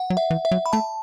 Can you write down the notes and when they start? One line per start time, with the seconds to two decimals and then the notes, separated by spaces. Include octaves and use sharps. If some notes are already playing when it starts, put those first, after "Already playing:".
Already playing: F#5
0.10 F#3
0.17 E5
0.31 E3
0.45 E5
0.51 F#3
0.66 B5
0.73 A3 A5